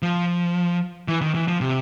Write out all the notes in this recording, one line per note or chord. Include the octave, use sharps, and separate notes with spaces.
F3
E3
D#3
E3
F3
C3